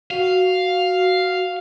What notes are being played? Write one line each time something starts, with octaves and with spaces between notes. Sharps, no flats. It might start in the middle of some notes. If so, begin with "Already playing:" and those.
F#4 F5